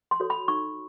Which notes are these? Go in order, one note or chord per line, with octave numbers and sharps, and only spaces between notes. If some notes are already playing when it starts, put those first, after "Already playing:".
C6
F#4 A4 C#5
B5
D#4 C#6